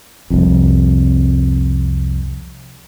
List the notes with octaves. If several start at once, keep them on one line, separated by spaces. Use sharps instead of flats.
C2 F2